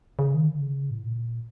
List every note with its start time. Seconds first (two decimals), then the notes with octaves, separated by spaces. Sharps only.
0.19 C#3
0.34 D#3
0.48 D3
0.61 C#3
0.90 A2
1.02 A#2